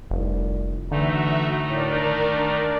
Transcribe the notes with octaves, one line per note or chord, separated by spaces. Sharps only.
F1 C2
D3 E3 A3 D#4 F#4 E5
A2 D4 A#4 D5
D#3